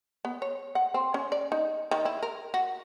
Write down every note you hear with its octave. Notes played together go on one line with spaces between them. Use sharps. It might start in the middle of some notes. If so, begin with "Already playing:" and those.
B3
C#5
F#5
C4
C#4
D5
D#4
D#3
E4
A#4
F#4